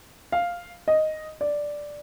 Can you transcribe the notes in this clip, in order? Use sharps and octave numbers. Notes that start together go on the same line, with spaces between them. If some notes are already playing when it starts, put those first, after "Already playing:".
F5
D#5
D5